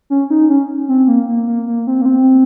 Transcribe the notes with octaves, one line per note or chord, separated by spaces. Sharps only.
C#4
D#4
C#4
C4
A#3
A#3
A#3
A#3
C4
A#3
C4